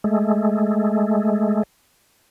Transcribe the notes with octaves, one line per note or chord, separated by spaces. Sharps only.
G#3 A3